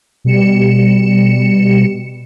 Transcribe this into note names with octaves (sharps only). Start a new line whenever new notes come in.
B2 G3 C#7 E7